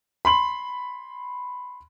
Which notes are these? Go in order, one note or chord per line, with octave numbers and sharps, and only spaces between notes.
B5 C6 F#7